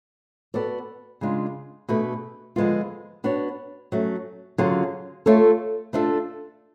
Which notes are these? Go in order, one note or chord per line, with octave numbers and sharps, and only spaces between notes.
B3 F#4 A4 D5
C#3 G#3 D4 F4
B2 A3 D4 G#4 B4
D3 F3 G#3 B3 F4
B3 D4 F#4 C#5
F#3 A3 C#4
D3 F#3 C#4 F4 G#4
A3 F4 A4 C#5
A3 D4 F4 A4